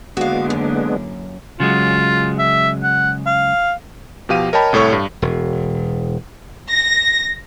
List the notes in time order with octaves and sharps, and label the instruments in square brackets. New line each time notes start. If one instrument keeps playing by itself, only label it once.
[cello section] D3 E3 A#3 [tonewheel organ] G#3 B3 D4 [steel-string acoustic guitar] F#4 F5
[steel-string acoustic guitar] F#2
[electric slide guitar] C#3 F#3 G#3 [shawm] F4
[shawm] E5
F#5
F5
[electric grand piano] B2 F3 G4 F5 D#7
A#4 C#5 D#5 G5 A5 B5
C2 A2 A4 C#5 C#6
G2
[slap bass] E1
[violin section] A#6